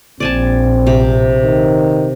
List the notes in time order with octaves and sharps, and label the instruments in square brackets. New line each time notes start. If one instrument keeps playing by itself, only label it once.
[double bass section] A#1 [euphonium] C4 [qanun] D5 G#5 A5
[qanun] C3
[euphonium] D#3